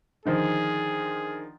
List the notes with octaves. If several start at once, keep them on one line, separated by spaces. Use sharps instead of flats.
D3 D#3 F3 G#4